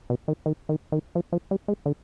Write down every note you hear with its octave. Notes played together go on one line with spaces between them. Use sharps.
B2
D#3
D#3
D#3
D#3
F3
F3
G3
G#3
D3